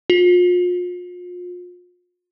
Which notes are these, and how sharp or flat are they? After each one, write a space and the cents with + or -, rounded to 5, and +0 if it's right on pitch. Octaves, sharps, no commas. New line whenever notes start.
F4 +35